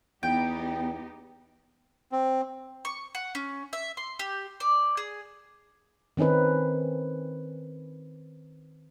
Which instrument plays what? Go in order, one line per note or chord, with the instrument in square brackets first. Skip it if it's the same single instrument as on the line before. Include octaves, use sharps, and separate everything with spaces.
[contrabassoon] E2 [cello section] B3 D#4 G4 [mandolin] G5
[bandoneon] C4
[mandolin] C#6
F#5
C#4
E5
C6
G4
D5
G#4
[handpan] D#3 C4 C#4 D#4 B4